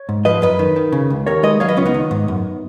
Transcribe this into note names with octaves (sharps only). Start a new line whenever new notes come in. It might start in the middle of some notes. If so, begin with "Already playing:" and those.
Already playing: C#5
G#2
F3 B4 D#5
F#2 B4 D#5
D#3
D#3
C#3
C#2
D#2 A#4 C#5
G#3 B4 D#5
F#3 C#5 F5
B4 D#5
C#2 C#4 F4
B3 D#4
D#3
G#2
F#2